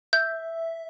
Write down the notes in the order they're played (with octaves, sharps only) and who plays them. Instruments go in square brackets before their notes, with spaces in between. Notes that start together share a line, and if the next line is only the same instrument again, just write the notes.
[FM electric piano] E5 [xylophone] G6